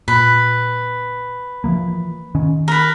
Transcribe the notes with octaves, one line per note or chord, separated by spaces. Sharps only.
A#2 B4
E3 F3 A#3
D#3 C#4
A#4 B4